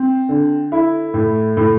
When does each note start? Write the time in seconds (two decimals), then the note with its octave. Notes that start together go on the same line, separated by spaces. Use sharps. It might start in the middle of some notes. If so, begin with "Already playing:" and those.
Already playing: C4
0.29 D3
0.72 E4
1.14 A2
1.57 A2